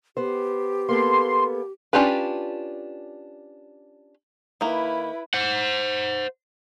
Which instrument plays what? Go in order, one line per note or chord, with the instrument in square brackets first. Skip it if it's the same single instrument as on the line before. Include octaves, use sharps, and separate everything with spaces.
[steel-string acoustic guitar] B3 C5 [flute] G4
[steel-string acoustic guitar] A#3 B3 A4 [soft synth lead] C6
[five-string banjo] C#4 D4 F4 G4 B4
[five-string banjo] D#3 A#3 [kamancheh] E4 B4
[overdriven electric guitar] C5 F#5